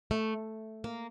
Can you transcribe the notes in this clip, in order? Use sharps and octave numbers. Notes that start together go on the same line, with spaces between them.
A3
A#3